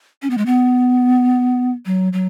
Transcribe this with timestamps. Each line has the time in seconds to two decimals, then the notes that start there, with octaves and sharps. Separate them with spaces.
0.22 C#4
0.30 B3
0.38 G#3
0.46 B3
1.86 F#3
2.13 F#3